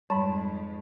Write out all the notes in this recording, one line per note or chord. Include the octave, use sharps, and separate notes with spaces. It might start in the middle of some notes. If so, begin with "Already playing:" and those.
F2 G#2 G3 A5 B5